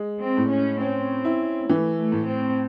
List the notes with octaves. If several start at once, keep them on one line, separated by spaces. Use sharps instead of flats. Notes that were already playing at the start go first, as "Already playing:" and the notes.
Already playing: G#3
C4
A2
C#4
C4 C#4
E4
E3 A3
A3
A2
C4